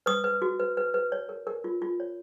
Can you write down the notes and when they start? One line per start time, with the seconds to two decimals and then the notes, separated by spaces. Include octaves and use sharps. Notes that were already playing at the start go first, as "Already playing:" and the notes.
0.06 B4 D#6
0.24 B4
0.42 F#4
0.59 B4
0.77 B4
0.94 B4
1.12 C#5
1.29 A#4
1.47 A#4
1.64 F4
1.82 F4
2.00 C#5